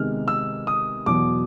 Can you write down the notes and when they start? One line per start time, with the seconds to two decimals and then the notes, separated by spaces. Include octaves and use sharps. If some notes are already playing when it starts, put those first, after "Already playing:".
Already playing: C3 D#3 G#3 B3 F6
0.28 E6
0.67 D#6
1.06 E2 B2 F#3 D6